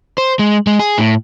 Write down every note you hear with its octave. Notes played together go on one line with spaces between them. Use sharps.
C5
G#3
G#3
G#4
A2